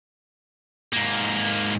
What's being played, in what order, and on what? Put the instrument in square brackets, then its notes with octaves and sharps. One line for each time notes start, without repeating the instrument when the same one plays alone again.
[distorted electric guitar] G#2 A#3